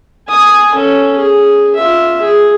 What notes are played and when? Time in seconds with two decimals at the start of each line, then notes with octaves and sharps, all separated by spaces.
0.28 G#5 D#6
0.74 C#4 A4
1.17 G#4
1.75 F4 E5
2.21 G#4